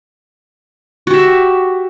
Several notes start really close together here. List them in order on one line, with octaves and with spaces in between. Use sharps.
F#4 G4 E5